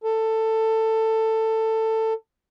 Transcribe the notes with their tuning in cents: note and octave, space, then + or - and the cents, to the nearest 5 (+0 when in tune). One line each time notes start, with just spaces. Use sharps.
A4 +15